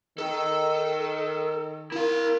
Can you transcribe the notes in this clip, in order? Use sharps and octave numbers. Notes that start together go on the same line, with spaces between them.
D#3 A4
E4 A#4 F5